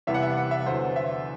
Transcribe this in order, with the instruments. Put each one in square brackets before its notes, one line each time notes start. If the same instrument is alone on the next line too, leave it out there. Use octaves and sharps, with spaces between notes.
[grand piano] E2 C3 E3 G3 E5
F#5
E5
F#5
E5
E2 D3 F#3 C5
E5